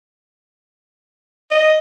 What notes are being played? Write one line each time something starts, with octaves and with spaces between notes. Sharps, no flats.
D#5